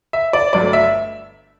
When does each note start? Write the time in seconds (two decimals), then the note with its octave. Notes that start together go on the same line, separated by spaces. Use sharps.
0.13 E5
0.33 D5
0.53 G1 G2 F#3 A3 D5
0.73 E5